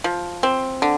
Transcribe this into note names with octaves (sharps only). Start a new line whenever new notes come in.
F3
C4
D3